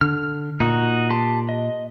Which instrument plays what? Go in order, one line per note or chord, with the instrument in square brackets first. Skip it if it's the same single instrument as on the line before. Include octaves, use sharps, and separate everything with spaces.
[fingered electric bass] D3 [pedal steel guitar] F6
[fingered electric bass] A#2 [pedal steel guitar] D#4 F#4 D#6
[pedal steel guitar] G4 A5 C6
D#5